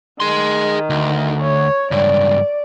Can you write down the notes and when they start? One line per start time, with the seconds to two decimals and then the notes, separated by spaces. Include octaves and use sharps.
0.20 D#3 G#4 C6
0.90 D2
1.40 C#5
1.91 C#2 G2 D5